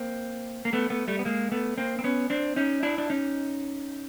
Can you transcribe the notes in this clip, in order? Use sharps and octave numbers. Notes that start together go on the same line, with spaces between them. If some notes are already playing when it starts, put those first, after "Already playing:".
Already playing: A#3 C4
A#3
A3 B3
A3 B3
G3 A3
B3
G#3 A#3
A3 B3
A#3 C4
C4
B3 C#4
C4 D4
C#4 D#4
D4 E4
D4
C#4 D#4